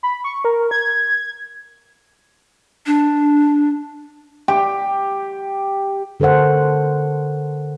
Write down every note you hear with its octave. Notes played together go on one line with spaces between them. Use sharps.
B5
C#6
A#4
G#6
D4
G4
D3 A4 A#4 C5 F#5